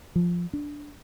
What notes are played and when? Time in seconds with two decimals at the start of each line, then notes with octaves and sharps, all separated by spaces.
0.16 F3
0.53 D4